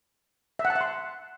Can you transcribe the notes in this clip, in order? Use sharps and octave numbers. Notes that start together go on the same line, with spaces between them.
E5
F#5
A5
F#5
C6